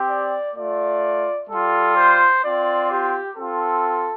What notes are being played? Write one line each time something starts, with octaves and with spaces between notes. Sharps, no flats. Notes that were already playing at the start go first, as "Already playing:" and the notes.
Already playing: C4 G4
D5
A3 F4 D5
G3 F4 A4
C5
C4 F4 D5
G4
C4 F4 A4